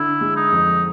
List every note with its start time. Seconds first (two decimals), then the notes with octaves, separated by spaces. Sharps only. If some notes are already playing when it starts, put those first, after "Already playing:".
Already playing: D3 E4
0.21 G#3
0.36 D#4
0.52 F2